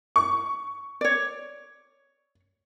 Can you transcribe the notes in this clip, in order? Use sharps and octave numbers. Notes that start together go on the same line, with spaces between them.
C#6
C#5 D5